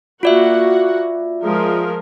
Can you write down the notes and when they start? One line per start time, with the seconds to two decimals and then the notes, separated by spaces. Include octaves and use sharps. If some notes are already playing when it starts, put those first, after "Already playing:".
0.23 A#3 F4 F#4 D5 E5 F#5
1.43 F3 G#3 A#4